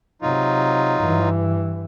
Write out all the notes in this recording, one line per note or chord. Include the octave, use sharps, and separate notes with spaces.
C3 F#3 D#4 F4
G2 E3